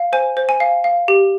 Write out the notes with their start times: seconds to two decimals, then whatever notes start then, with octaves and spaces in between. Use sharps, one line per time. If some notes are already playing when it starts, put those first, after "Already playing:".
Already playing: F5
0.13 C5 G#5
0.37 C5
0.49 G#5
0.60 F5
0.84 F5
1.08 G4